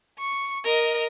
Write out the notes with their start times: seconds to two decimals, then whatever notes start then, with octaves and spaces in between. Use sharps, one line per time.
0.19 C#6
0.65 A#4 D#5